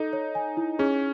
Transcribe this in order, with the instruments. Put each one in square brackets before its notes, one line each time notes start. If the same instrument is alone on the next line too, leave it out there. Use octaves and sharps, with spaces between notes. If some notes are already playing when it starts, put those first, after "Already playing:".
Already playing: [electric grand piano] D#4 [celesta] A4
[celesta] C#5
G#5
E4
[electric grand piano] C#4 [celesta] G#4